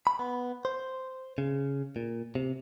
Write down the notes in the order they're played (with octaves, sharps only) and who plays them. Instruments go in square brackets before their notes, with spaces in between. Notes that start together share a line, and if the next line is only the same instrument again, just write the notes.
[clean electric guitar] B5
B3
C5
C#3
A#2
C3